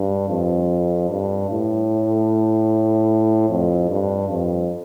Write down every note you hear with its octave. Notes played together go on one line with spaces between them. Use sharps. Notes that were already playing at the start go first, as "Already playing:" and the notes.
Already playing: G2
F2
G2
A2
F2
G2
F2